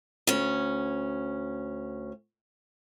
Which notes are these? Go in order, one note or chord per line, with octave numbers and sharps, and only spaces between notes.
D2 C#4